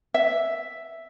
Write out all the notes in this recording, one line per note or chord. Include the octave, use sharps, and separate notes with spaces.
E5